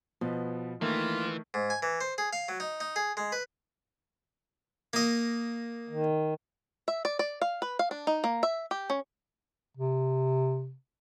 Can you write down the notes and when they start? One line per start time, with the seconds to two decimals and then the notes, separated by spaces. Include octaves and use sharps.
0.21 B2 F3 B3
0.82 D#3 E3 A3 A#3 F4
1.54 G#2
1.70 G#5
1.83 E3
2.01 C5
2.18 G#4
2.33 F5
2.49 F#3
2.60 D#4
2.80 D#4
2.96 G#4
3.17 G#3
3.32 B4
4.93 A#3 D#5
5.89 D#3
6.88 E5
7.05 D5
7.19 D5
7.42 F5
7.62 B4
7.79 F5
7.91 D4
8.07 D#4
8.24 A#3
8.43 E5
8.71 G4
8.90 C#4
9.77 C3